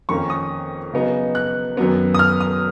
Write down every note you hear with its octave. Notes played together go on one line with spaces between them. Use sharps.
F2 D#3 A#3 C#4 C#6
D#6
C#3 F#3 B3 D#4
F#6
F#2 D#3 F#3 B3
D#6
F6
D#6